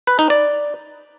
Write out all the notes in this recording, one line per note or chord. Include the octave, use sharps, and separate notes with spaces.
B4
D#4
D5